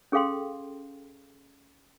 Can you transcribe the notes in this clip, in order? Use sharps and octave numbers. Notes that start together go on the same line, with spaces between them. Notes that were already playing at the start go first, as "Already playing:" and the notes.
C#4 G#4 A4 F5 G5 C6